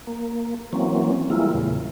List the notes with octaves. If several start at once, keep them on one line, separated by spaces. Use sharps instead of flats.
A#3
E3 F#3 A#3 C4 C#4
E3 G3 G#3 A#3 E4 F4
E2 A#2 C#3